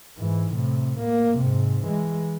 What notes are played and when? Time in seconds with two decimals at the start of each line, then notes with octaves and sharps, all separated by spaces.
0.18 G#2 E3
0.52 A2 C3
1.00 A#3
1.38 G#2 C3
1.84 E3 G#3